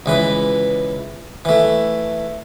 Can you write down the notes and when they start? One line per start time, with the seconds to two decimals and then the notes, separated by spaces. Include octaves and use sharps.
0.06 C#2 E3 B4
1.45 E3 A3